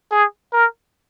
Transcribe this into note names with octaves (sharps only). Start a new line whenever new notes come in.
G#4
A#4